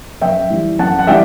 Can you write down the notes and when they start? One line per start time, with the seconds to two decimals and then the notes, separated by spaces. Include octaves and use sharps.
0.21 F#2 E5 G5
0.50 E3 G3
0.79 F#2 F#5 A5
0.99 F#5
1.07 E3 G3 E5 G5